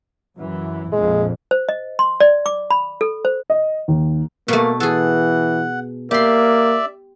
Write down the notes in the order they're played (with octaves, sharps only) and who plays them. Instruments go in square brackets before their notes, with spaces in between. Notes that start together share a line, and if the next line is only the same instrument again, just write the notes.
[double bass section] F#2 E3
[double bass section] A#1 F2 [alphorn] G#3
[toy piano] C5
D#5
C6
D5
D6
B5
A4
C5
[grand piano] D#5
D#2
[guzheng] B2 A3 [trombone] A#3
[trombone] E3 [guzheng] G#4 A4 [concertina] F#5
[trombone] A#3 [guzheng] G4 C6 [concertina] D5 E5